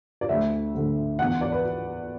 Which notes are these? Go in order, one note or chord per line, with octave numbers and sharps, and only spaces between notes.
D5
D2 D3 E5
D2 D3
E2 E3 F#5
D5
B4